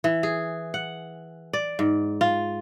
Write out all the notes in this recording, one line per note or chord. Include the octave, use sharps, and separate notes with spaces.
E3
G#4
F#5
D5
G#2
F4